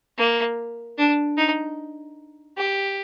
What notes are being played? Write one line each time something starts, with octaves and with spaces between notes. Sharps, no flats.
A#3
D4
D#4
G4